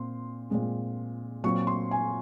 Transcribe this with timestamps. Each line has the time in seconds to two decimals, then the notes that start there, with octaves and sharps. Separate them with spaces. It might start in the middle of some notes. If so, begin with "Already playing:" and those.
Already playing: A#2 C4 C6
0.50 A#2 G#3 C4
1.44 A#2 F#3 C4 C#6
1.67 C6
1.91 G#5